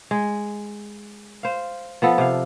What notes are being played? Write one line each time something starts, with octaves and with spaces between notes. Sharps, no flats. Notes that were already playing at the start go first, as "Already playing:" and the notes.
G#3
C5 F5
F3 B3 A4
C3 F5